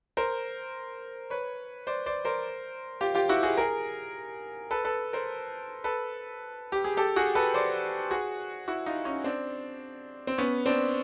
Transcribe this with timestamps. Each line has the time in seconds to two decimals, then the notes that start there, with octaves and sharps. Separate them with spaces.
0.17 A#4 C5
1.30 B4 C#5
1.87 C5 D5
2.06 C5 D5
2.25 A#4 C5
3.01 F4 G4
3.15 F4 G4
3.29 E4 F#4
3.43 F#4 G#4
3.57 G#4 A#4
4.71 A4 B4
4.84 A4 B4
5.13 A#4 C5
5.84 A4 B4
6.72 G4
6.84 G#4
6.97 G4 A4
7.16 F#4 G#4
7.35 A4 B4
7.54 C5 D5
8.11 F#4 G#4
8.68 E4 F#4
8.86 D#4 F4
9.05 C#4 D#4
9.24 C4 D4
10.27 C4
10.38 B3 C#4
10.66 C4 D4